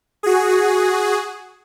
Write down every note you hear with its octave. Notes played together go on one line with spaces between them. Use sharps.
F#4 G#4